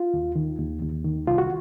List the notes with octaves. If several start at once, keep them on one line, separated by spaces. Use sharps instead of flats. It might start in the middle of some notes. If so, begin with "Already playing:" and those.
Already playing: F4
D#2
D#3
D#2
D#2
D#3
C2 F4
F#4